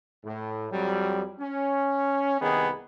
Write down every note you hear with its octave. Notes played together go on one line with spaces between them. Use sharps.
A2
F2 F#3 G3
C#4
C2 D#3 B3 G#4